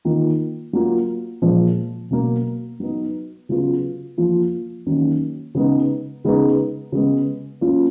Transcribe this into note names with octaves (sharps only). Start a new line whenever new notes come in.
D#3 A#3 F4
F#3 A#3 F4
A#2 F3 G#3
B2 F#3 A#3
F#3 B3 D#4
C#3 F#3 B3 F4
F3 A#3 F4
D#3 F#3 A#3 C#4
C#3 G#3 B3 D#4
C#3 G#3 B3 D#4
C#3 G#3 B3
F#3 A#3 C#4 F4